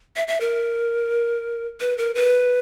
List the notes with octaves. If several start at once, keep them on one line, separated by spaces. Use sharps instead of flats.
E5
E5
A#4
B4
A#4
B4